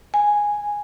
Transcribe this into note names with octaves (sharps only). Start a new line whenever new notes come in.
G#5